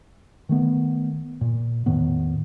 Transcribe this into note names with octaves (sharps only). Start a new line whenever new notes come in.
D#3 A3 B3
A#2
E2 A2 D#3 B3